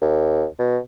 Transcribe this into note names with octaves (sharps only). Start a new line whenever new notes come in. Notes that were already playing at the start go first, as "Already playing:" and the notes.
D#2
B2